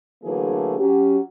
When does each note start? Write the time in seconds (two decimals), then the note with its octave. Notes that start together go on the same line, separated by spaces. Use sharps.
0.23 D3 E3 F#3 A3 A#3 G#4
0.78 F#3 C#4 G4